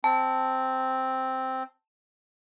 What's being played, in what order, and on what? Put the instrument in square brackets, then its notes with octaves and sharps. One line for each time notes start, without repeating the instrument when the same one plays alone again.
[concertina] C4 [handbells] A5